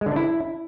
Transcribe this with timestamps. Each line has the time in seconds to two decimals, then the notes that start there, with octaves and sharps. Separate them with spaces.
0.01 G#3
0.06 D3
0.11 D4
0.16 E4